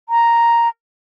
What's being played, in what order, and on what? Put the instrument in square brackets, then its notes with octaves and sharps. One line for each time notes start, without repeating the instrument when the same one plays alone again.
[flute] A#5